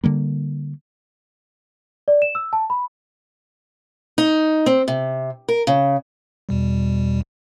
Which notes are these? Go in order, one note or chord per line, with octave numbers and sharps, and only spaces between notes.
D3 G3 A#3
D5
E7
E6
A5
B5
D#4
C4
C3
A#4
C#3
E2 B2 G3